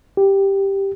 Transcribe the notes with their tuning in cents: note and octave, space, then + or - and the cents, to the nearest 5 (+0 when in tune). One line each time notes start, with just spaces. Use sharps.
G4 +0